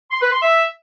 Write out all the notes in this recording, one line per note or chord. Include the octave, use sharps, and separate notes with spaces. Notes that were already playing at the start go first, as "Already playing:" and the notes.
C6
B4
C6
E5